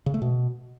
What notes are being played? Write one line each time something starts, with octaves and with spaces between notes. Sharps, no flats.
C#3
A3
B2